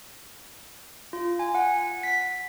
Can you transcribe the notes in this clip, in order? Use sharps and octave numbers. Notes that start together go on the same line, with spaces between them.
F4
G#5
F#5
B6